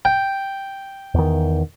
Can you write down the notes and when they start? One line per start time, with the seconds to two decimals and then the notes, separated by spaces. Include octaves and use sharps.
0.05 G5
1.14 E2 D#3